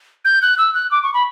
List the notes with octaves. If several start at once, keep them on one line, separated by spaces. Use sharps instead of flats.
G6
F#6
E6
F#6
D6
C#6
B5